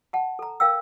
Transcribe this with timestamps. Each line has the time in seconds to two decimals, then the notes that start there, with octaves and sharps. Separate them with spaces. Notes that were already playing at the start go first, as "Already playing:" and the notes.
0.13 F#5 A5
0.39 A4 A#5
0.60 A#4 F5 G5 E6